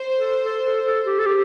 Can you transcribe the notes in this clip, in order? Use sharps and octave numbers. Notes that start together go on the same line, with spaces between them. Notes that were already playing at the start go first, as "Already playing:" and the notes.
Already playing: C5
A4
A4
A4
A4
G4
A4
G4